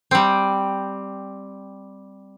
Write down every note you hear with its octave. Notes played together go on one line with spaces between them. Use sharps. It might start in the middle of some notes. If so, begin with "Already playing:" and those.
G3 C4